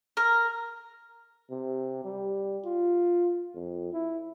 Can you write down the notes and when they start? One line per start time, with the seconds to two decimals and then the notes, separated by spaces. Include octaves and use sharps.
0.17 A#4
1.51 C3
2.04 G3
2.65 F4
3.54 F2
3.93 E4